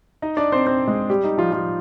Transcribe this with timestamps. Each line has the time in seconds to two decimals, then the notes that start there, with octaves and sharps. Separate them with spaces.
0.22 D#4 D#5
0.37 D4 D5
0.52 C4 C5
0.66 C4 C5
0.87 G#3 G#4
1.10 G3 G4
1.24 D#4
1.37 F3 F4
1.52 F3 F4